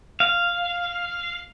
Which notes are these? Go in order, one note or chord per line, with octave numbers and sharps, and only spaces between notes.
F5